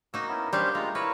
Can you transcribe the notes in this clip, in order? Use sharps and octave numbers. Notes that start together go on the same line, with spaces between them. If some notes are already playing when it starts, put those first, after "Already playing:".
A#3 D#4 F#4 E6
B3 C#4 E4
G3 C#4 D4 G4 C5 F5
G#3 A3 F4 A#5
E4 A#4 B4 C#5